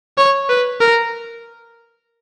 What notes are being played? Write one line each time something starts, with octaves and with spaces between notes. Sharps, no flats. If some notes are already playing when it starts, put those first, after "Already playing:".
C#5
B4
A#4